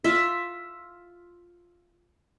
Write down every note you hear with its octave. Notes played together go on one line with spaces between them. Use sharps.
F4 E5